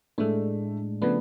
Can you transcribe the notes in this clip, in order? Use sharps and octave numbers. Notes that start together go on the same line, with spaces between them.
A2 G#3 A3 D4
C#3 F3 A3 B3 D4